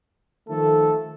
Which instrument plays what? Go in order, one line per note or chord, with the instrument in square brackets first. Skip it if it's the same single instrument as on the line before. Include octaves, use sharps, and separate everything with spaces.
[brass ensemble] D#3 F3 A3 A4